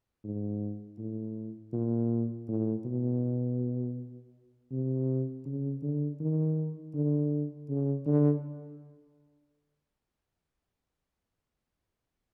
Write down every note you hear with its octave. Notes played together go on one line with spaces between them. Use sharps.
G#2
A2
A#2
A2
B2
C3
C#3
D3
D#3
D3
C#3
D3